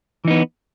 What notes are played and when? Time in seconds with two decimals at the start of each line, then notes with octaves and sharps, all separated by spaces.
0.25 E3
0.28 D#4
0.30 B3